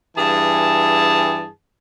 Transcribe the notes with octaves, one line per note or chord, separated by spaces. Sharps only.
G2 E3 G#4 A5